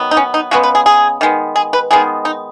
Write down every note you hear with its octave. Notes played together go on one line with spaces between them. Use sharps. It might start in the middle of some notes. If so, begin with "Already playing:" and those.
Already playing: D#3 F#3 B3
D#4
C#4
D#4
C#3 G#3 B3 F#4
B4
G#4
G#4
D#3 G#3 B3
G#4
B4
D#3 G#3 B3 G#4
D#4